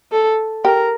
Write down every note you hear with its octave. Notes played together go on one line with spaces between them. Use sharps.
A4
G4 A#4